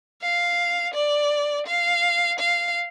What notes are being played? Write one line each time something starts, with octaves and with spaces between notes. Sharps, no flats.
F5
D5
F5
F5